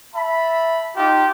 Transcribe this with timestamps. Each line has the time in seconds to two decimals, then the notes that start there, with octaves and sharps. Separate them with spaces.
0.15 E5 A5 B5
0.96 D#4 F4 G4